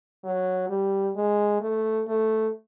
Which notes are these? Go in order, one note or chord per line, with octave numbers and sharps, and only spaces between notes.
F#3
G3
G#3
A3
A3